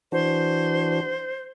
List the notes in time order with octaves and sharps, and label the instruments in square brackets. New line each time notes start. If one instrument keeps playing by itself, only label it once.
[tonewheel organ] E3 D4 F#4 [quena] C5